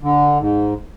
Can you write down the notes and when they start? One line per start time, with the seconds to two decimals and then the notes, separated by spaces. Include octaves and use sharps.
0.02 D3
0.40 G#2